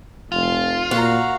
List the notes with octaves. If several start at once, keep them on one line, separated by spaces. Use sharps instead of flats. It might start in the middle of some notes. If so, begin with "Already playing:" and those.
F1 F4
A#2 F#4 F5 A#5